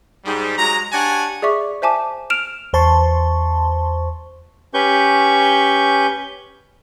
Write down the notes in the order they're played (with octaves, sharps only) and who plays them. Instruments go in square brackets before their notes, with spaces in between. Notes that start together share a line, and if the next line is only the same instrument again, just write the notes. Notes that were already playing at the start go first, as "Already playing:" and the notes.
[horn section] G#2 G3
F#3 G#3 A#5
D4 G4 C#5 F#5 G#5
[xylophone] G#4 D5 E5 C#6 D6
C5 E5 G#5 A5 D6
F6 D7 E7 F7
[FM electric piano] E2 C5 A5 C6 C#6
[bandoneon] C#4 G4 B4 C#6 G6